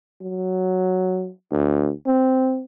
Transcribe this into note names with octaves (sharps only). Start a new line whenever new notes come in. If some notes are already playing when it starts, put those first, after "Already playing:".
F#3
D2
C4